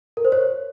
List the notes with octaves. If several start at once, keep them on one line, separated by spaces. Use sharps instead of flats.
A#4
C5
C#5